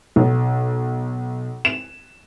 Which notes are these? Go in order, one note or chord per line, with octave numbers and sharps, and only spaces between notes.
B1
E7